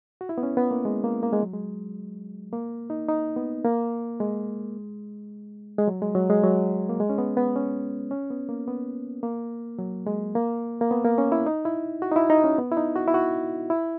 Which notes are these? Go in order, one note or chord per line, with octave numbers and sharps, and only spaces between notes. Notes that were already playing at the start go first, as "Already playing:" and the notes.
F#4
E4
B3
C#4
B3
A#3
G#3
A#3
A#3
G#3
F#3
G#3
A#3
D#4
D#4
B3
A#3
G#3
G#3
F#3
G#3
F#3
G#3
F#3
A#3
G#3
C#4
B3
B3
C#4
C#4
B3
A#3
B3
A#3
F#3
G#3
A#3
A#3
B3
A#3
C#4
E4
D#4
E4
F#4
D#4
E4
D#4
C#4
B3
E4
D#4
F#4
E4
F#4
E4